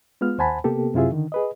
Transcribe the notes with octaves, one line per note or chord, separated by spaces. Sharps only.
G#3 B3 F4 F6
D#2 C5 F#5 G#5 A5 B5
C3 A#3 B3 G4 A4
F#2 C3 E4 F4 G#4 E5
D3 D#3
G#4 B4 D#5